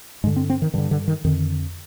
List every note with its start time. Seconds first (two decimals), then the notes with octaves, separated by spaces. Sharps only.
0.24 G2 G#3
0.27 D3
0.36 C4
0.50 C4
0.62 D#3
0.74 G2 D3 D#3
0.91 D3
1.08 D#3
1.24 F2 D3 D#3